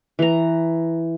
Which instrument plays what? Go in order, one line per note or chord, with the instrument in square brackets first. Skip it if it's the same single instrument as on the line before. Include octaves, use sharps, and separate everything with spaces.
[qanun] E3 A#5